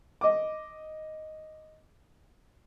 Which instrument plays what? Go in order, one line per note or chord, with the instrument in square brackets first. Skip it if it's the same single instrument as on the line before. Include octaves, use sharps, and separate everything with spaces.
[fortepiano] D#5 D6